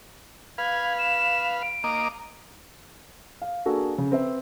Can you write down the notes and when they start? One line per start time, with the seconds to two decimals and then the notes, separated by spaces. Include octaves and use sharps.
0.58 B4 F5 G#6
0.99 E7
1.62 D7
1.84 A#3 D#5 D6
3.42 F5
3.65 A#3 D4 F#4 G#4 A4
3.98 C#3
4.12 C4 B4 E5